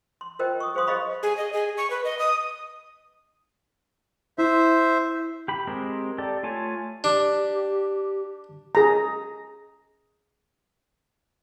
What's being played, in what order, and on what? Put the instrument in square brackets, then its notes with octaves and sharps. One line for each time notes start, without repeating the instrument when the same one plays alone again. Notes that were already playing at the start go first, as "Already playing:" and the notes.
[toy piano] C6
F4 A#4 C5 D#5 G5
C#6 D#6
G#4 C5 F5 C6 D#6
G#4 C5 D#5 F5 B5 C#6
[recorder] G#4
D#5
G#4
C#6
B4
D#5
D#6
[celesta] E4 [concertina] C5 E5
[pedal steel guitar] G4 B5
G#3 C4 G4 A#4
G4 A4 D5
A3 F4 C#5 G#5 A5
[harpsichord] D4 [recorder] G4
[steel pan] G#4 A#5